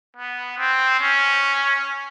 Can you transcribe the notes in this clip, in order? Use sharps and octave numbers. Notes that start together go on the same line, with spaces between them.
B3
C4
C#4